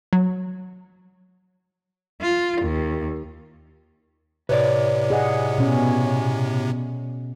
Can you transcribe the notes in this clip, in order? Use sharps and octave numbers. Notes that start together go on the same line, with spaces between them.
F#3
F4
D#2
A2 C3 B4 C#5 D5
G#4 D#5 F#5
B2 C#4